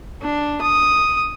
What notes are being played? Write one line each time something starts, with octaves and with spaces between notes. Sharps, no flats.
D4
D#6